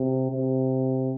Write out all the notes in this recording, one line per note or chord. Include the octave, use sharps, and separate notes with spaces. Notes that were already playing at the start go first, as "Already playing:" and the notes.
Already playing: C3
C3